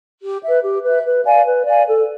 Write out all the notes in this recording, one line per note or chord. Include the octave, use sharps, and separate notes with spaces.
G4
B4 E5
G4
B4 E5
B4
D5 F5 G#5
B4
D5 F5 G#5
A4